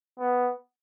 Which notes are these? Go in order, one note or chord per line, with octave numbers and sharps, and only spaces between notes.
B3